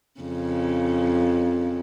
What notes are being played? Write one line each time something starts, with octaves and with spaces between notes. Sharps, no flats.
F2 C#3